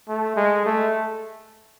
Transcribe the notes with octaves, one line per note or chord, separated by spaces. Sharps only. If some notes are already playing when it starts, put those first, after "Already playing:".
A3
G#3
A3